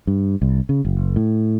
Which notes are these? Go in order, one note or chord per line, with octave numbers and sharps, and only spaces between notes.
G2
C2
C#3
F#1
A2